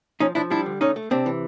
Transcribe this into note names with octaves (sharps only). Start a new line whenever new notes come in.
F3 C#4 D#4
F3 D4 E4
G3 D4 E4
D3
A3 C#4 D#4
A3
C3 C4 D4
E3